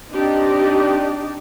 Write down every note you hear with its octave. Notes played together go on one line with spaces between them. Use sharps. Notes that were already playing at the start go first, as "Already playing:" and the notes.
C4 D4 D#4 G4 D5 D#5